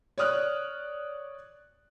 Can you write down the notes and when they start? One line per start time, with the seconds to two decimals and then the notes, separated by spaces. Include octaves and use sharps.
0.18 C#5 D5 D#6 F6 F#6